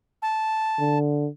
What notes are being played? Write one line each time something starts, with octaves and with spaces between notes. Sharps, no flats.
A5
D3